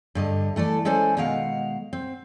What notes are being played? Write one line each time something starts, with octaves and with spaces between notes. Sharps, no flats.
G2 D3 D#5
E3 A3 A4 D5
G#3 C#4 A4 C5 D5 G#5
B2 D#3 G#3 F5 F#5
C4